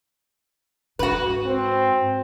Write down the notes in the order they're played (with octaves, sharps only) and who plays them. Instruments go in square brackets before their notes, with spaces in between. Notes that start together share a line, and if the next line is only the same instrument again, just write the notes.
[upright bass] G#2 [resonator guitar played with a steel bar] F#4 B4
[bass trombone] C4